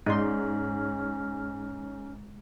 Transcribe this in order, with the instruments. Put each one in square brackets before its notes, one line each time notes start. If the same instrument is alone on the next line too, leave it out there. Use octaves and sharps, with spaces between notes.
[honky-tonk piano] G#2 [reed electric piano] G#3 [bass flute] C#4 [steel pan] D#4 D5 C6